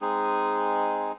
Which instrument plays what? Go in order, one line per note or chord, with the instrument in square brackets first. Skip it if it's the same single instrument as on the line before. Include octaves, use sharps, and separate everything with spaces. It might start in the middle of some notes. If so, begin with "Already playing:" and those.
[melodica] G#3 C4 D#4 G#4